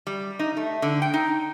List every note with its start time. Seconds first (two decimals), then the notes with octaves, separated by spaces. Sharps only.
0.07 G3
0.39 D#4
0.57 A3
0.82 D3
1.02 G5
1.14 D#4